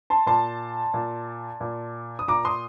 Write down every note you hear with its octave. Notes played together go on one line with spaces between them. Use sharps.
A5 C6
A#2 A5 C6
A#2
A#2
D#6
A#2 A#5 D6
C6 D#6